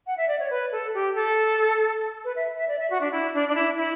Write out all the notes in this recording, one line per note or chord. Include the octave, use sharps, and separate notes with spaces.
F#5
E5
D5
C#5
B4
A4
G4
A4
B4
E5
E5
D5
E5
F#4
D4
E4
D4
D4
E4
E4